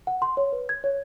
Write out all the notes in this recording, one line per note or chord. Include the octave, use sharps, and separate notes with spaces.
F#5
C6
C#5
B4
G#6
C#5